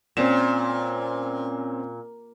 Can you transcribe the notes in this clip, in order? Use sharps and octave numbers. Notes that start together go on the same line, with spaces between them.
A#2 C4 C#4 E7